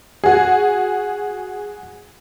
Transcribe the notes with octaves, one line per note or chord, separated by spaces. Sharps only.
F#4 G#4